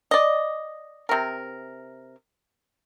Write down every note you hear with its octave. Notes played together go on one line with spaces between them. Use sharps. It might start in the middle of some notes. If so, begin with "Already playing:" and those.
D5 D#5
C3 A#4